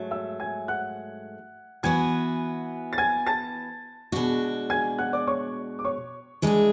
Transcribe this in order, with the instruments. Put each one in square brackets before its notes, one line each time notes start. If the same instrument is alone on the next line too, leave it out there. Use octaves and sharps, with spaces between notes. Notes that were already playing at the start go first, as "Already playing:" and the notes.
Already playing: [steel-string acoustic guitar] G#2 F#3 A3
[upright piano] E5 E6
G#5 G#6
F#5 F#6
[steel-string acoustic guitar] E3 B3 F#4 [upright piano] G#5 G#6
[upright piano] A6
G#5 G#6
A5 A6
[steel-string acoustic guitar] B2 G#3 D4 F#4
[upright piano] G#5 G#6
F#5 F#6
D5 D6
C#5 C#6
D6
C#5 C#6
[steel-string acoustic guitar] E3 G#3 D4 G#4